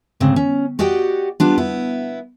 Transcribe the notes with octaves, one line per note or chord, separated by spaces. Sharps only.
D2 G#2 C#3 C4
C#4
F#4 G4 D5 D#5 F#5 G5
G3 B3 D4 F4
B3 E4